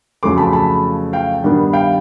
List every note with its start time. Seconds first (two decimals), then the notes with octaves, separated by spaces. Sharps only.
0.23 F2 C#3 F#3 A3 C6 D6
0.38 A5 B5
0.53 A5 B5
1.13 F5 G5
1.43 G2 D#3 G3 B3 D4
1.73 F5 G5